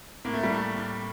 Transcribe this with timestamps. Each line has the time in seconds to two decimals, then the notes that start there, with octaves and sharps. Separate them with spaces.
0.25 A2 A#3
0.34 A3
0.43 G3
0.50 A2 A3
0.76 A2